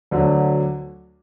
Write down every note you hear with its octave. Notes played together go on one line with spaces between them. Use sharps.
D2 D3 F#3